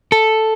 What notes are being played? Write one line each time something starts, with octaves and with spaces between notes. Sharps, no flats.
A4